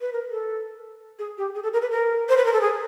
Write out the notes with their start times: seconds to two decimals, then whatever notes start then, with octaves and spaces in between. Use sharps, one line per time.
0.01 B4
0.13 A#4
0.31 A4
1.19 G#4
1.38 G4
1.55 G#4
1.63 A4
1.73 A#4
1.82 B4
1.91 A#4
2.29 C5
2.37 B4
2.45 A#4
2.53 A4
2.61 G#4